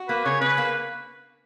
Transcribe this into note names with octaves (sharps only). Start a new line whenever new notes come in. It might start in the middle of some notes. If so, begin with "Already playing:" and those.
Already playing: F#4
A#3 B4
C#3 C#5
C#3 B4
A#3